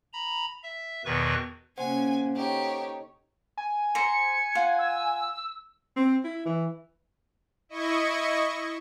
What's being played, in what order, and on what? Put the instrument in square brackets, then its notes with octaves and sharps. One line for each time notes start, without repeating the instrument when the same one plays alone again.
[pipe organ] A#5 B5
E5
E2 B2 D#3 B4 C#6
[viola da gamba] C#3 A#3 C#4 [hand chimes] C5 F#5 [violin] G#5
[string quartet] D#4 C#5 [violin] G4 [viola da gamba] A4
[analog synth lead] G#5
[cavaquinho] C5 A#5 [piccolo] C#7
[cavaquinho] F4 F#5
[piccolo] E6
[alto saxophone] C4
E4
E3
[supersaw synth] E4 D#5 C#6